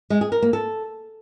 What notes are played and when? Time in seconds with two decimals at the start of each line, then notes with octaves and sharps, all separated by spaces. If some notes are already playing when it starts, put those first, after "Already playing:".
0.10 G#3
0.21 G#4
0.32 A#4
0.42 A#3
0.53 A4